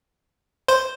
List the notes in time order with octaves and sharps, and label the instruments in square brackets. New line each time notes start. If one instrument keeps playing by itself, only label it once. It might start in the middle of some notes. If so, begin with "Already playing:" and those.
[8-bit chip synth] C5